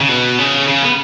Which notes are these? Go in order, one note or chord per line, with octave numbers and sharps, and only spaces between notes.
C#3
B2
C#3
C#3
B3